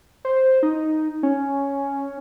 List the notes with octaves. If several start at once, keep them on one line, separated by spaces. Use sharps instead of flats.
C5
D#4
C#4